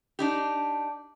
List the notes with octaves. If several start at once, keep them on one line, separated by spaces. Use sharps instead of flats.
D4 D#4 G4